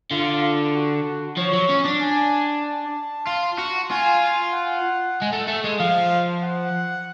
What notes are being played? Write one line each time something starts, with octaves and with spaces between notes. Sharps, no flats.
D3 F4
F#4
F3 C#5
F#3
C#4
D4
G#5
A5
F4
F#4
F4 G#5
F#5
G#3
A3
A3
G#3
F3 F5
F#5